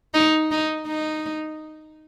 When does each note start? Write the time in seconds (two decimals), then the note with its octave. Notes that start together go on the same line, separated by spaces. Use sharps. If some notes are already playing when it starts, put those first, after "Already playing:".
0.14 D#4
0.51 D#4
0.87 D#4